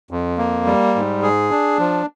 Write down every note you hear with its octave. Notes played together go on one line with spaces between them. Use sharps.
F2
A#3
G3
G#2
G#4
D4
F3